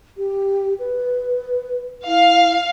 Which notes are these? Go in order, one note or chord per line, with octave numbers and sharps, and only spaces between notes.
G4
B4
E4 F5